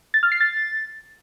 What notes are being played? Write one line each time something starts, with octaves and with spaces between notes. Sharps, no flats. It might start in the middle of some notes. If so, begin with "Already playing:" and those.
A6
F6
C7
A6